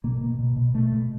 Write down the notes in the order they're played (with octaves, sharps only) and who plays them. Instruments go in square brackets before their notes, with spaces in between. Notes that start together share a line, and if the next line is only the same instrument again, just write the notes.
[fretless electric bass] B2 A#3
B2
B2
B2
B2 A3
B2